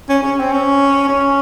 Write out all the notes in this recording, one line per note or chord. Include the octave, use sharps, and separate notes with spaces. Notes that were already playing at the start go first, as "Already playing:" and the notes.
C#4
C#4
C4
C#4
C#4